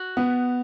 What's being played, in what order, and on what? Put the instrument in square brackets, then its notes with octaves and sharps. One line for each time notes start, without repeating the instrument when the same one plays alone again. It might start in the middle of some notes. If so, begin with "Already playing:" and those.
Already playing: [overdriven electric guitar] F#4
[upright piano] B3